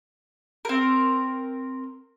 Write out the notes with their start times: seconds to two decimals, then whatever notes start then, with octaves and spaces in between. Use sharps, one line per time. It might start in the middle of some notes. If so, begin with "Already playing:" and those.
0.65 C4 A#4